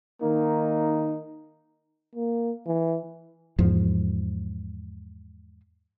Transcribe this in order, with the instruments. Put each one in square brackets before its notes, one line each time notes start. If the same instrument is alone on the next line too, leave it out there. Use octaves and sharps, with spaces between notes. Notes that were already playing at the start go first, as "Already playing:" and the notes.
[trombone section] D#3 A#3 D#4
[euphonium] A#3
E3
[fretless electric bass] E2 G#2 F3